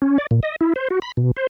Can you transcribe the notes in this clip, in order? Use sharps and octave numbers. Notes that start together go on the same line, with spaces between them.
C#4
D5
A#2
D#5
E4
C5
F#4
B5
B2
C5